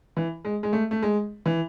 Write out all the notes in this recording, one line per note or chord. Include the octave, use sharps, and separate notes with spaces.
E3
G#3
G#3
A3
A3
G#3
E3